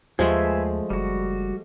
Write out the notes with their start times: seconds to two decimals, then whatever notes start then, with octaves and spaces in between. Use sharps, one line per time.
0.19 D#2 F3 G#3 A3 G#4 B4 E5
0.90 F#1 G3 F#4